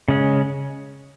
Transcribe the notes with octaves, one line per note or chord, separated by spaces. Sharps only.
C#3 G#3 C#4